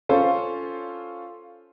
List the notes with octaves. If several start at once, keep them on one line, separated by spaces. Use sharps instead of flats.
C#4 F4 A4 C5